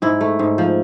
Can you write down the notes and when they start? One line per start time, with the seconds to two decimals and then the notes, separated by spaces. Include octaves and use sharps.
0.02 G#2 E4
0.21 A3
0.39 G#2
0.58 F3